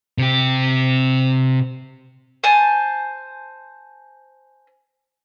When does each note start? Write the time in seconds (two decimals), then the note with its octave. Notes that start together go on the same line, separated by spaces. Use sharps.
0.18 C3 G4
2.44 C5 G#5 A5